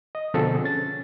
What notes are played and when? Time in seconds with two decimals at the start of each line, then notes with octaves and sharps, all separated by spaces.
0.15 D#5
0.34 B2 D3 F3 C4 G#4 A4
0.64 C#4 A6